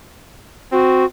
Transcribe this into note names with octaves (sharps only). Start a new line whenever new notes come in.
C4 F#4